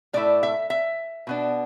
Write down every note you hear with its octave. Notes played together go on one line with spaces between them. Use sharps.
A2 A3 E4 D5
E5
E5
B2 B3 D4